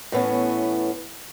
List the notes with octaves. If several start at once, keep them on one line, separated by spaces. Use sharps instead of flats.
A2 E3 B3 C#4